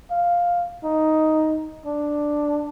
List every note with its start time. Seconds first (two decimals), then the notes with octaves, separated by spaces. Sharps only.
0.11 F5
0.84 D#4
1.86 D4